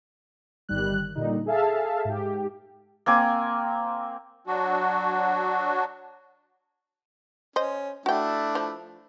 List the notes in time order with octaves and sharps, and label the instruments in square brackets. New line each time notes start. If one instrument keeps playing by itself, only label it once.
[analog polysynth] G1 D#3 G3 F#6
A#2 D3 G3 D#4
G#4 A4 E5 F5 A5
G#2 G4
[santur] A#3 C4 G#5 D6
[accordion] F#3 D4 F#4
[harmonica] C#4 [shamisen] C5 D#5
[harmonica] A3 D4 E4 [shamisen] F#4 G5
[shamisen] F3